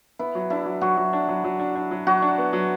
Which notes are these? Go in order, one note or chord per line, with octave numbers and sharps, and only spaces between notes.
B3 E4
F#3
D4 E4
F#3
F#3 F#4
F#3
D4
F#3
F#3
D4
D4
F#3
F#3 F#4
D4
B3
F#3